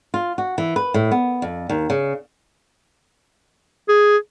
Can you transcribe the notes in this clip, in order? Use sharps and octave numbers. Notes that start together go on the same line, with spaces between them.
F4
F#4
E3
B4
A2
B3
F2
D#2
C#3
G#4